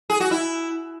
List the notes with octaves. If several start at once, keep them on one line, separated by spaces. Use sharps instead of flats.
G#4
F#4
E4